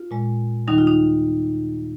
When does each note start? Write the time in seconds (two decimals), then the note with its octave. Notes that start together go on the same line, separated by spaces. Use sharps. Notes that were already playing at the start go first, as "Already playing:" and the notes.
Already playing: F4
0.11 A#2 G#3
0.67 D#2 D#3 G3 D#4
0.78 F4
0.87 D#4